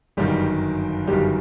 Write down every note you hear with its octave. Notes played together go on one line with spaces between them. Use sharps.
G1 F#2 D#3 G3 G4
G1 F#2 D#3 G3 G4